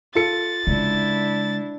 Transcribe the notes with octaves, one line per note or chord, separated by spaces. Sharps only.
F4 A4 A6 C#7
C#3 G#3 D4 E4